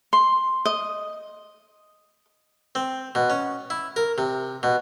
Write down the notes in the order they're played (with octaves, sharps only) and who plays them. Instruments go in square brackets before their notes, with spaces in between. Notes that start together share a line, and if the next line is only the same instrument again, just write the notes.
[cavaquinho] C6
D#5
[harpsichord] C4
B2
C#4
E4
A#4
C3
B2